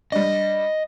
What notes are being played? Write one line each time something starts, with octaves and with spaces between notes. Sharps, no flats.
G3 D4 D#5